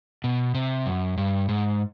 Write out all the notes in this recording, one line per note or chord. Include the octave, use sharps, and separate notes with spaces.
B2
C3
F#2
G2
G#2